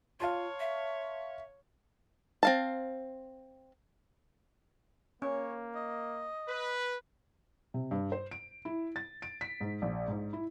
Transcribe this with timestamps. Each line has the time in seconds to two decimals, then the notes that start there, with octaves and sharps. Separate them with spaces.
0.20 F4 C#5 F5 A5 C6
0.60 E5
2.43 C4 F5 A5
5.22 A#3 C#4 C#5
5.75 D#5
6.48 B4
7.74 C3
7.91 G2
8.12 C5
8.31 D7
8.65 E4
8.96 A6
9.22 D7
9.41 B6
9.61 G#2
9.82 A#1
10.08 G#2
10.33 E4